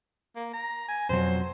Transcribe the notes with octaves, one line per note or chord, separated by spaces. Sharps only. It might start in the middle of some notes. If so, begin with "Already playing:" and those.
A#3
A#5
G#5
F2 B2 F#3 C5